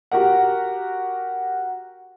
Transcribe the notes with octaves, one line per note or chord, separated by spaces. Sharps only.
F#4 G4 A#4 F#5